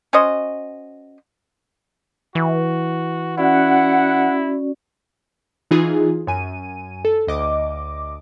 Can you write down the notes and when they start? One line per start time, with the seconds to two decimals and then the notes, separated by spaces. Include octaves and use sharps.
0.13 C#4 F#4 C5 D#5
2.35 E3 F#4
3.38 C#4 E4 F#4 D5 F#5
5.71 E3 D#4 F4 G#4
6.27 F#2 G#5 D#7
7.05 A4
7.27 D2 D#5 D6